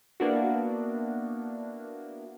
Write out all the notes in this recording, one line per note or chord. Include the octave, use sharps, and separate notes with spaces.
A#3 B3 D4 E4 F#4